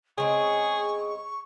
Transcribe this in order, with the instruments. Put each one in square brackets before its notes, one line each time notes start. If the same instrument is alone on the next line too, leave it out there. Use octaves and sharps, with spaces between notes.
[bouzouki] C#3 G#3 C4 [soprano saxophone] G#4 [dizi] C#6